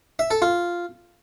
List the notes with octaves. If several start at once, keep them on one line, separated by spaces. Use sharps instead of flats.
E5
A4
F4